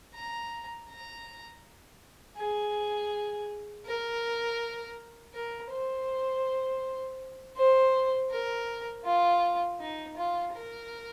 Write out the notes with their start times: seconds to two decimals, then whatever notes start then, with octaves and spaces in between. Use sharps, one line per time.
0.14 A#5
0.90 A#5
2.38 G#4
3.86 A#4
5.34 A#4
5.72 C5
7.57 C5
8.31 A#4
9.05 F4
9.80 D#4
10.17 F4
10.54 A#4